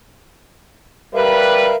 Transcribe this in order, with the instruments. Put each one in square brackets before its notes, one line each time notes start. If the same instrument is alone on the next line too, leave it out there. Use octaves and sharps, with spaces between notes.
[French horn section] G3 B4 [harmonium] A#4 E5 F5